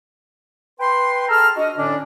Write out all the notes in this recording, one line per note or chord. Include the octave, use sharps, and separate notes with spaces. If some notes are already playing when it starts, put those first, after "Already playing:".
B4 G5 C6
G#4 A4 A5 A#5 E6 F6
D4 F#4 D#5
A2 D3 C#4 D4